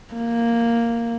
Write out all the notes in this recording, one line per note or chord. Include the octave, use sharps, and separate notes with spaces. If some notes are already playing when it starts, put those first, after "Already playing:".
A#3